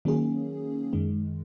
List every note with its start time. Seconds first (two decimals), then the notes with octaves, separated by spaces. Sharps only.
0.05 D#3 F#3 A#3 C#4 G#4
0.93 F#2 D#3 G#3